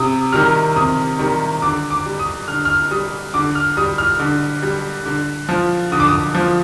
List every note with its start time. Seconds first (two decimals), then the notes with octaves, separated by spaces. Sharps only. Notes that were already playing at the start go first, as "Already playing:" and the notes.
Already playing: C3 D#6
0.33 D#3 G3 F6
0.76 C3 D#6
1.19 D#3 G3
1.62 D3 D6
1.90 D6
2.06 G3
2.19 D#6
2.48 D3 F6
2.65 F6
2.91 G3 D#6
3.34 D3 D6
3.55 F6
3.77 G3 D#6
3.98 F6
4.20 D3
4.63 G3
5.06 D3
5.49 F3
5.92 D3 D#6
6.00 D6
6.08 D#6
6.35 F3